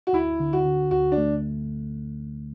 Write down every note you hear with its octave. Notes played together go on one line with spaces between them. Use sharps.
F#4
D2 E4
D3
F#4
D3
D2 F#4
D4
A3